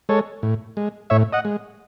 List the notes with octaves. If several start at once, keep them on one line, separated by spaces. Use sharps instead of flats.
G#3 A4 C#5
A2
G#3
A2 C#5 E5
D#5 F#5
G#3